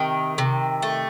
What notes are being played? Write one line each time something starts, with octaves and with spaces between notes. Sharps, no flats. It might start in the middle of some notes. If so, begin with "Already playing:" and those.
Already playing: C3 D#3
C3
A3